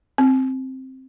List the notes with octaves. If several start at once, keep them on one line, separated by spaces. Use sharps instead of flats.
C4